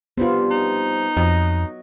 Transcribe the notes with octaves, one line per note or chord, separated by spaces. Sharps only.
C3 G3 B3 D4 F4
D#4
F2 F#3 D#5